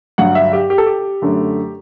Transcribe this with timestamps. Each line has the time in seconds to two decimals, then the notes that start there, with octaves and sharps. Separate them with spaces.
0.18 G2 D3 F#3 F#5
0.35 E5
0.53 G4
0.70 G4
0.78 A4
0.87 G4
1.22 F#2 D3 A3